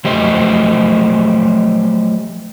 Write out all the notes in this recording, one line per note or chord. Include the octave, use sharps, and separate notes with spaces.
F3 F#3 A3 G4 C5 D#5